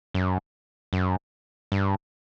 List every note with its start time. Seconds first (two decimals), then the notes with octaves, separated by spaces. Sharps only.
0.14 F#2
0.93 F#2
1.72 G2